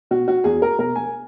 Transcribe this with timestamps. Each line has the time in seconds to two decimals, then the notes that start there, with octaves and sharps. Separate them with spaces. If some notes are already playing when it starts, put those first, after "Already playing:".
0.11 B2 F#4
0.28 F#4
0.44 E2 G#4
0.62 A#4
0.79 B2 A#4
0.96 G#5